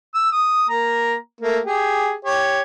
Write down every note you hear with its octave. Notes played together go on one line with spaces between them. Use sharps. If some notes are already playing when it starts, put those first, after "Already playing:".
E6
D#6
A#3 A#5
A3 A#3
G4 G#4
G4 C#5